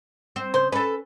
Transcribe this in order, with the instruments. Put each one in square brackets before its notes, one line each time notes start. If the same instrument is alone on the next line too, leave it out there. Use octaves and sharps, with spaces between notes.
[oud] C4
[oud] C#3 [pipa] C5
[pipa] C#4 [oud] A4 B4